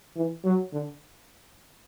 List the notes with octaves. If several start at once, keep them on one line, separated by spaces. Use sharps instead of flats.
E3
F#3
D3